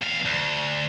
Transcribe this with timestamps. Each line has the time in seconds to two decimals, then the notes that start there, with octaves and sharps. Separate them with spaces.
0.02 E2 F5
0.25 D2